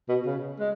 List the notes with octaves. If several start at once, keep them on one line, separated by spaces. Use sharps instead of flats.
B2
C#3
G#3